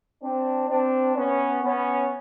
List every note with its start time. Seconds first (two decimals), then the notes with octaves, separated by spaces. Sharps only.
0.22 C4 D4
0.68 C4 D4
1.16 B3 C#4
1.63 B3 C#4